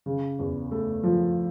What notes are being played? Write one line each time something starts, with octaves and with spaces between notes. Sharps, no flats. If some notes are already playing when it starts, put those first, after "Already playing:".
C#3
E2
A3
F3